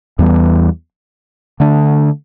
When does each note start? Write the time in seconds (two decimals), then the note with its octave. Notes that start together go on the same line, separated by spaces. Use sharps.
0.19 E2 E3 G3 B3
1.60 D3 A3 D4